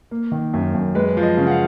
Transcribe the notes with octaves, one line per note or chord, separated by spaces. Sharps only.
A#3
D#3
F#2
F#2
G#3 B4
F3
D#5
C#3
F#5
F5